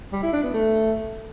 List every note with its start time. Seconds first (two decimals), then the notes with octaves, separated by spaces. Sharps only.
0.13 G3
0.23 E4
0.33 D4
0.43 B3
0.54 A3